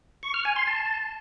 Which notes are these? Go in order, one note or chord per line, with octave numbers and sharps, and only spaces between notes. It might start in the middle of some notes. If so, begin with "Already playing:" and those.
C#6
F6
G#5
C6
A5